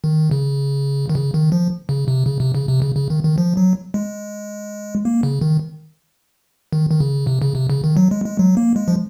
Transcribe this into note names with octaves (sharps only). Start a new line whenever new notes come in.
D#3
C#3
D#3
C#3
D#3
F3
C#3
C3
C#3
C3
C#3
C3
C#3
C#3
D#3
D#3
F3
F#3
G#3
A#3
C#3
D#3
D#3
D#3
C#3
C3
C#3
C3
C#3
D#3
F#3
G#3
G#3
F#3
A#3
G#3
F3